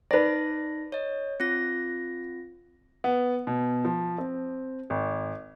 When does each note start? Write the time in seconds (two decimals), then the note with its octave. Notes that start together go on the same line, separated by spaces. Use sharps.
0.11 D#4 B4 D5 A#6
0.92 C#5 D#5
1.40 C4 F4 A#6
3.04 B3
3.47 B2
3.85 F3
4.18 C4
4.90 G#1